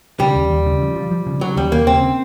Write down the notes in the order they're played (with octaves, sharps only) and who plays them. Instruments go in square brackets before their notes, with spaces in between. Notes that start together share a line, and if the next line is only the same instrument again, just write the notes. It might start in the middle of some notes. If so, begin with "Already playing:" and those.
[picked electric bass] C#3 [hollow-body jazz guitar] G3
[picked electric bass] D#2
D#2
C#3
F3
F3
F3
C#3
[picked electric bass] C#3 [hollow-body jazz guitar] F#3
[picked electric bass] D#2 [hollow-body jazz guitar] G3
[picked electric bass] D#2 [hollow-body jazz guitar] A#3
[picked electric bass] C#3 [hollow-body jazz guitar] C4